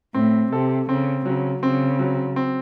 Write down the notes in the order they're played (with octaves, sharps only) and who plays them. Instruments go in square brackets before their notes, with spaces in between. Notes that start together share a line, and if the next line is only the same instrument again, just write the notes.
[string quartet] A2 [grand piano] C4
[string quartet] C3 [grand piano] A4
[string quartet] C#3 [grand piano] C4
[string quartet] C#3 [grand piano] F#3
[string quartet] C#3 [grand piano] C4
[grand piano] F#3
C4